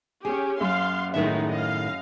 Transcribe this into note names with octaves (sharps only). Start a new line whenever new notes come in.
C#4 G4 G#4
F#2 F5 C6
A2 D#3 G#3 B3 D#4 E5
D#5 F5